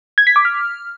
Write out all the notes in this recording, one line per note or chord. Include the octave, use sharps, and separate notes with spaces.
G#6
B6
D6
F6